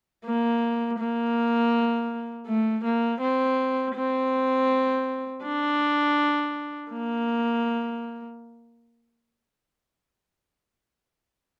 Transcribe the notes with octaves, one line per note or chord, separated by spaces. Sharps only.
A#3
A#3
A3
A#3
C4
C4
D4
A#3